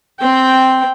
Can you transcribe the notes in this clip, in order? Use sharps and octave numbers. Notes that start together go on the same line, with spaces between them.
C4 G5